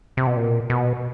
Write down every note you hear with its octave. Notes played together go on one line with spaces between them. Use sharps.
C3
B2
A#2
B2